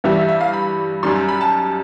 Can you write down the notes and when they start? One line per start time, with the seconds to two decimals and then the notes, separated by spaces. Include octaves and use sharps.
0.04 G2 E3 G3 E5
0.17 E5
0.28 E5
0.41 F5
0.53 B5
1.03 F#2 D#3 G3 C6
1.16 A#5
1.29 B5
1.41 A5